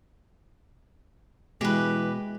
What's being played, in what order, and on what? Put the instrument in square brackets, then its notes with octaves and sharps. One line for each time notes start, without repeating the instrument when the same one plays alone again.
[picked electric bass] B2 [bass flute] E3 [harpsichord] G#3 [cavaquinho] G4 B4